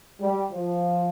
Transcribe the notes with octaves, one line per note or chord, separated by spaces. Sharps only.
G3
F3